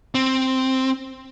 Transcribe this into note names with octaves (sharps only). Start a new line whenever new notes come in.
C4